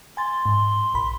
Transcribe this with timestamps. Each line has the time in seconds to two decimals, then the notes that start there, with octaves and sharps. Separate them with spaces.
0.17 G#5 C6 A6
0.46 G#2
0.94 A#1 B5